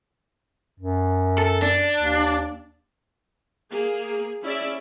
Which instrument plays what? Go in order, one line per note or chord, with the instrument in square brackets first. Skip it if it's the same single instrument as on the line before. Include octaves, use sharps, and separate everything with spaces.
[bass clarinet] F#2
[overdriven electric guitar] A4
D4
[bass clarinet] D#2
[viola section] A#3 G#4
C#4 E4 G#4 D5 E5